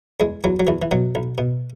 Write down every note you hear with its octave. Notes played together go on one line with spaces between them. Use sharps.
E2 G#3
E2 F#3
F#3
E2 E3
E3
B2 F#3
B1
B2